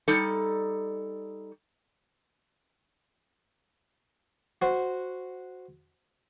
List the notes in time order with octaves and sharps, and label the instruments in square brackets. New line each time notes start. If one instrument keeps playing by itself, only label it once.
[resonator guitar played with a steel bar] G3 D#4 A4
[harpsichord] F#4 C5